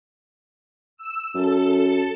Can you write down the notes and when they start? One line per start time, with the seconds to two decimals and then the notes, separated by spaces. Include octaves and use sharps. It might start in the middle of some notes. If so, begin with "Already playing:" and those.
0.97 E6
1.34 F#2 A4